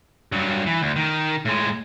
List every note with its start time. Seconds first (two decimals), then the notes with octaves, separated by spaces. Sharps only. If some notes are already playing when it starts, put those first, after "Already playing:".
0.32 G2 F#3
0.66 E3
0.81 D2
0.96 D#3
1.45 A2 G#3